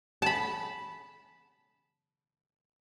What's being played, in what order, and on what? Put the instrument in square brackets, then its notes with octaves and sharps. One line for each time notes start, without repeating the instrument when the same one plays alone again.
[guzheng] A5 B5